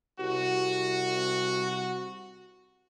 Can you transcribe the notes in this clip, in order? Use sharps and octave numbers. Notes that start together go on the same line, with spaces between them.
C2 F#4